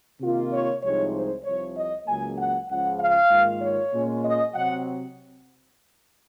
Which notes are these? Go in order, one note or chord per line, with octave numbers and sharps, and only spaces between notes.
C3 D#3 A#3 F4
C#5
C2 C3 F3 G#3 D#4 C#5
C5
C2 C3 F3 C#5
D#5
C#2 C#3 F#3 A#3 G#5
F#5
C#2 C#3 F3 F#5
F5
G#2 D#3 A#3 F4
C#5
A#2 G#3 C#4 F4
D#5
C3 F#3 C4 F#5